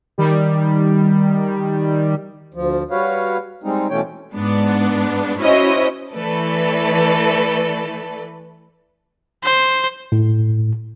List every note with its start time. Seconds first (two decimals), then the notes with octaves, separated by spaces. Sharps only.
0.18 D#3 G3
2.54 D2 F3
2.91 G3 F#4 B4 C#5 F5
3.64 G3 G#3 C4 D#4
3.90 B2 E3 A3 C#4 C#5 G5
4.34 G#2 B3 D4
5.38 C#4 E4 F#4 C5 C#5 D#5
6.13 E3 A3 A4 B4 D5
9.44 C5
10.12 A2